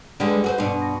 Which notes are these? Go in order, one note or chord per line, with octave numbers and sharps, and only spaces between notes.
D3 G3 G#3 B4
F#4 G#4 C5
G2 B2 D4 C6 C#6 D#7
A#6